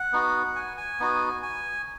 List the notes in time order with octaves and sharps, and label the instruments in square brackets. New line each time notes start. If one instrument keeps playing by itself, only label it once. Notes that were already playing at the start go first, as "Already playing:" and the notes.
Already playing: [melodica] F#5
B3 D#4 F#4
G#5
G#5
B3 D#4 F#4
G#5